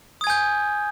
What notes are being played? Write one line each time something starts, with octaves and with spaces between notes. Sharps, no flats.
G#5 D#6 G6 G#6